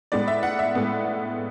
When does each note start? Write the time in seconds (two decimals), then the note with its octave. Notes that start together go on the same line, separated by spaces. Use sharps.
0.12 A2 G#3 B3 D5
0.28 E5
0.43 F#5
0.59 E5
0.75 A2 G#3 B3